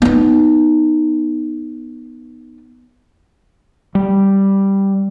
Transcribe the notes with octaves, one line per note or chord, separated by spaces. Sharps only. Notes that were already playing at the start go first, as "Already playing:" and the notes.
B3 D#4
G3